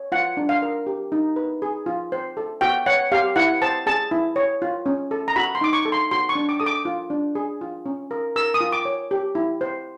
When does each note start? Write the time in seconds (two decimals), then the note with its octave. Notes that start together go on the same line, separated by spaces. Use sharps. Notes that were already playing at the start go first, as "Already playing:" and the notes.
Already playing: C#5
0.12 F4 F#5
0.37 D4
0.49 F5
0.62 A#4
0.87 G4
1.12 D#4
1.36 B4
1.62 G#4
1.86 F4
2.12 C5
2.37 A4
2.61 F#4 G5
2.86 C#5 F#5
3.12 G4 F5
3.36 E4 F#5
3.62 C5 A5
3.86 G#4 A5
4.11 E4
4.36 C#5
4.62 F4
4.86 C#4
5.11 A4
5.28 A#5
5.36 F#4 B5
5.55 C6
5.61 D#4 D6
5.73 C#6
5.85 A4
5.92 C6
6.11 F#4 C6
6.29 C#6
6.35 D4
6.49 D6
6.60 A4 D#6
6.66 D6
6.85 F4
7.10 D4
7.35 G#4
7.61 F4
7.86 C#4
8.11 A#4
8.36 A#4 E6
8.54 D#6
8.61 F4
8.72 D6
8.85 C#5
9.11 G4
9.35 E4
9.61 C5